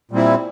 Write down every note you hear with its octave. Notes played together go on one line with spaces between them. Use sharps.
A#2 G3 C4 E4